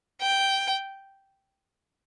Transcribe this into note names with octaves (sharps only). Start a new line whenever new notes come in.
G5